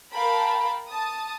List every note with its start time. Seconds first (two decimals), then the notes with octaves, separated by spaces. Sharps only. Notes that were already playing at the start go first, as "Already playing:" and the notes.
0.12 A#4 F5 G5 A5 B5
0.87 A5 D#6